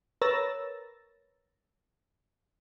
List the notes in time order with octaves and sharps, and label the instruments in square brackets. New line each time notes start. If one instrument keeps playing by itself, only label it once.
[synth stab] A#4 B4 C#5 E6 A6 A#6